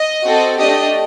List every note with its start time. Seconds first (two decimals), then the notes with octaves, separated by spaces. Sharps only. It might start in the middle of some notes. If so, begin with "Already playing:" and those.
Already playing: D#5
0.25 C4 F#4 A4
0.58 A3 D4 G4 D#5